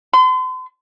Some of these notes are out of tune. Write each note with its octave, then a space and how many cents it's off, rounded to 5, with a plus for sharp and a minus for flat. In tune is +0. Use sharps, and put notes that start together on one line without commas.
C6 -40